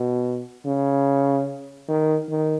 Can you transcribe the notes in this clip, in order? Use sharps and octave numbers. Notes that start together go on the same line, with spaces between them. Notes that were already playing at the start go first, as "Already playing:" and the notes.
Already playing: B2
C#3
D#3
D#3